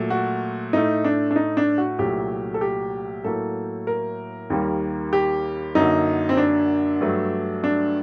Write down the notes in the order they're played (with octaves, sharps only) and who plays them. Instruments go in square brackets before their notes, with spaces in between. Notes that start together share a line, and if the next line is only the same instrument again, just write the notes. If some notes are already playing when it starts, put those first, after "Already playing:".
Already playing: [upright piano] A#2 F#3 A3
F#4
A2 A3 D#4
D4
D4
D#4
D4
F#4
C2 A#2 F#3 A3 G4
A4
G4
A2 F#3 A#3 A4
A#4
D#2 D#3 G3 A#3
G4
F#2 D3 F#3 A#3 D#4
C4
D4
G2 F#3 A3
D4